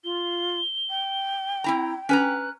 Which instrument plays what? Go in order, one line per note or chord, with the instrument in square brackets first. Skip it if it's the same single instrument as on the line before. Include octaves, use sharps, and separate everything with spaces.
[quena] F4 [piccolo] G7
[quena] G5
[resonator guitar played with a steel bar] C4 E4 A#5
[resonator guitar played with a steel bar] C#4 B4 A#5 [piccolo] F#6